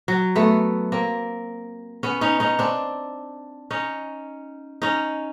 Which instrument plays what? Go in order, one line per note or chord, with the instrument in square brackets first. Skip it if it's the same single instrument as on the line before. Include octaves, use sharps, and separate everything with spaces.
[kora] F#3
A3 B3
A#3 C4
B3 C#4
C#4 D#4
C#4 D#4
C4 D4
C#4 D#4
C#4 D#4